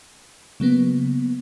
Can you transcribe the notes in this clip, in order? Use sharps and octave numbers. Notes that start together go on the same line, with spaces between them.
C#3 F#3 A#3 B3